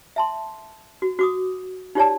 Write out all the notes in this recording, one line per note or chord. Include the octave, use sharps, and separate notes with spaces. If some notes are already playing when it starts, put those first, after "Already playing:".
E5 A5 C6
F#4
F#4 D6 D#6
D#4 F4 G4 C#5 D5 A5